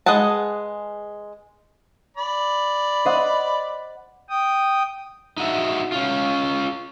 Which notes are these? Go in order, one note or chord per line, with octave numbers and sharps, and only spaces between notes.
G#3 G#4 B4 F#5 A5
D5 B5
C5 D#5 F#5
G5 D#6
D#4 F#4 E5
C#4 F4